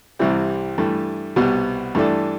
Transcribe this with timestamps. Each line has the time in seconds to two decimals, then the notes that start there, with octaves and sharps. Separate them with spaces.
0.19 C2 C3 E3 G3 C4
0.78 G2 E3 A3
1.36 C2 B2 G3 B3
1.95 G2 E3 A3 D4 A4